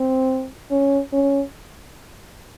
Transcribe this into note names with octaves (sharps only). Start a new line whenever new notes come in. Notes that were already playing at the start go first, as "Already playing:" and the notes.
Already playing: C4
C#4
C#4